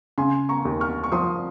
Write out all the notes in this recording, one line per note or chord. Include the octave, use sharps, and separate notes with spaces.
C#3 G#5 C6
A#5 C#6
D#2
C#6 F6
C#6
F3 C6 D#6